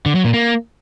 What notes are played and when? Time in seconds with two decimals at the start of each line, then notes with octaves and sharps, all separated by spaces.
0.06 D3
0.15 F#3
0.24 A#2
0.34 A#3